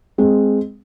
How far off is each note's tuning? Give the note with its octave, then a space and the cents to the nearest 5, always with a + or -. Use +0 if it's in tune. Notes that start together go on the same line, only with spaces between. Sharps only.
G#3 +0 C4 +0